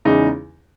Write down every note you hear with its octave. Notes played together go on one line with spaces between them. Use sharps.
E2 C#3 G#3 D#4